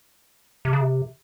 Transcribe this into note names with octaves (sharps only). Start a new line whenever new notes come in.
C3
C#3
C3